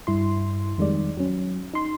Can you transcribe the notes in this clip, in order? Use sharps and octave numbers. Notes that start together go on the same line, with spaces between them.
G2 E4 C6
F2 D#3 G3 G#3 D5
F#3 C#4
D#4 C6